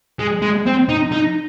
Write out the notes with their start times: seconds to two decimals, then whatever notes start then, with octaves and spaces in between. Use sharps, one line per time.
0.19 G#3
0.42 G#3
0.66 C4
0.89 D#4
1.12 D#4